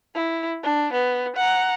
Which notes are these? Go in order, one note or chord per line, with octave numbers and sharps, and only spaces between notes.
E4
D4
B3
F#5 A#5